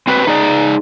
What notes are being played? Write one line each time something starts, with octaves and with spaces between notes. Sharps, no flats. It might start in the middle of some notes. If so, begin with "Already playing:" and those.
C4 F#4 B4
D#4 G#4 D5